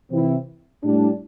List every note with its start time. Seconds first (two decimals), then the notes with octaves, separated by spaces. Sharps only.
0.10 C3 E3 C4 E4
0.83 A2 G3 D4